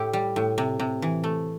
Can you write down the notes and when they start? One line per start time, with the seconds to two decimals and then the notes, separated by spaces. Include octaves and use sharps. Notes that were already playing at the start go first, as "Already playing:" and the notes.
Already playing: A2 E4 G4
0.13 G3
0.36 A2
0.58 C3
0.80 C3
1.02 E3
1.24 A3